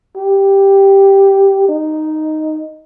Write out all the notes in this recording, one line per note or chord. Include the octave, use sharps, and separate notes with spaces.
G4
D#4